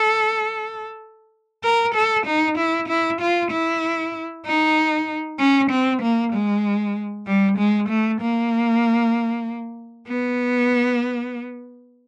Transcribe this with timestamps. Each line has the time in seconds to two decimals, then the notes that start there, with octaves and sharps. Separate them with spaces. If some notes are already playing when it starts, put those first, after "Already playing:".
Already playing: A4
1.64 A#4
1.95 A4
2.26 D#4
2.58 E4
2.88 E4
3.21 F4
3.51 E4
4.46 D#4
5.39 C#4
5.70 C4
6.02 A#3
6.33 G#3
7.26 G3
7.58 G#3
7.89 A3
8.21 A#3
10.08 B3